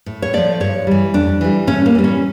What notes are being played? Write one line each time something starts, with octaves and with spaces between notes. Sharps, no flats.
A2
C#5
F3 A3 D5
G2 C#5
E3 G3
F2 D4
E3 G3
A2 C#4
A#3
E3 G3
C#4